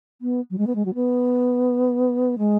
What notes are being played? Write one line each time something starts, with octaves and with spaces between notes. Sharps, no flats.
B3
F#3
G#3
B3
G#3
F#3
B3
G#3